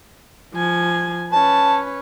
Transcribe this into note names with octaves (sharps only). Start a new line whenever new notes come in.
F3 G#5
C#4 B4 A5